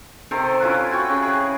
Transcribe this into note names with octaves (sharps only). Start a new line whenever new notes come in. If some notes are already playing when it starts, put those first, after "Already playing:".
C3 D#3 A4 C5
C#4 E4 F4 B4
F#4 G5 C#6
C#3
G#4